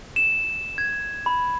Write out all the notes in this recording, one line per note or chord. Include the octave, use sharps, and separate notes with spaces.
E7
G#6
B5